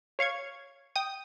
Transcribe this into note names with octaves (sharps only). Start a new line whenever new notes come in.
C#5 F5 C#6 G#6
G5 D#6